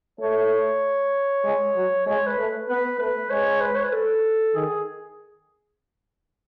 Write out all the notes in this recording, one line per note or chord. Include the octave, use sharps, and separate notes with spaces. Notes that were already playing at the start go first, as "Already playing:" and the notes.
A3 C#5
G#3
F#3
G#3 C#5
B4
A3
B3 B4
A3 B4
G#3 C#5
B4
C#5
B4
A4
D#3 G#4